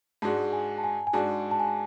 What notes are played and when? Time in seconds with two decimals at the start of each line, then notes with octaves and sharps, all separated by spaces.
0.22 G#2 G#3 D4 F#4 A5
0.53 G#5
0.78 A5
0.84 G#5
1.07 G#5
1.13 G#2 G#3 D4 F#4 A5
1.51 A5
1.60 G#5